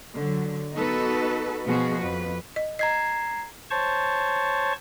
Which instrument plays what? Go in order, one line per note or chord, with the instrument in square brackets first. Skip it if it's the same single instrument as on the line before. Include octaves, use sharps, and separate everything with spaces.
[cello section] D3 F#3
B3 D#4 F#4 A4 B4
B2 F3 B3 F#4 G#4
F2 B4
[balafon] D#5
[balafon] D#5 [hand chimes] A#5 G#6 C7
[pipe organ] C5 C#5 A5 C#6